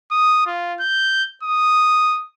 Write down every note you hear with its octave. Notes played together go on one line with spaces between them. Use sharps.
D#6
F4
G6
D#6